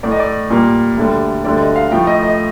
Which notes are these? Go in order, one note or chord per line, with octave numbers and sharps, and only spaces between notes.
A2 A3 D5
D#5
D5
A#2 G3 A#3
D2 D3 G3
D2 D3 G3 D5
D#5
F5
A2 F3 A3 G5
D#5
D#5